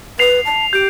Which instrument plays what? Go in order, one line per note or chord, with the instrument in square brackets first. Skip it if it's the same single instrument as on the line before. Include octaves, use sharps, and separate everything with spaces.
[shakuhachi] B4 [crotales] C7 F7
[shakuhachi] A5
[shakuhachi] G4 [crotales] G6 D7